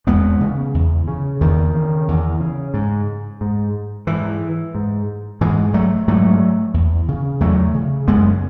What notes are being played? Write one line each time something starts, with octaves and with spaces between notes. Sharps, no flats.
E2 G#3 B3
C#3
E2
C#3
E2 D#3
C#3
E2
C#3
G#2
G#2
G#2 E3
G#2
G#2 E3 G#3
F#3 A3
G#2 F#3 A3
E2
C#3
E2 F#3 A3
C#3
F#2 G#3 B3